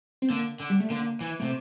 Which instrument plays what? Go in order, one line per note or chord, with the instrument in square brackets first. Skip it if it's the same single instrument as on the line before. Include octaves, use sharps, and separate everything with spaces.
[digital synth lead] C4
[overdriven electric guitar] D3 [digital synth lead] A#3
[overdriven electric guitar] D3
[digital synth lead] G3
A3
[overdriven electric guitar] D3 [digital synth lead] A#3
[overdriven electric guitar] E3
[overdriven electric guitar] C3 [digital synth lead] A3